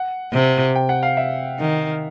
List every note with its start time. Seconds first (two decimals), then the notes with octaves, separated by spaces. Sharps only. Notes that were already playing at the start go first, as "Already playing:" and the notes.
Already playing: F#5
0.33 C3
0.75 G5
0.89 F#5
1.03 F5
1.17 E5
1.59 D#3